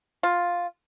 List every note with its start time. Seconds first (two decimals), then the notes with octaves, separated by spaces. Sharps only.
0.23 F4